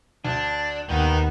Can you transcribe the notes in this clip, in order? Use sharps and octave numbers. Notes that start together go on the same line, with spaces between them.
D2 D4
D#2 D#3 B3 D#4 G5